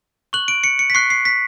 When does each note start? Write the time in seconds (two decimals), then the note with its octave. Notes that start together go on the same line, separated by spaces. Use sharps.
0.33 C#6 F#6 F#7
0.48 D7
0.64 C#7
0.79 C#7
0.90 B6
0.95 C#6 F#6 C7
1.10 C7
1.25 B6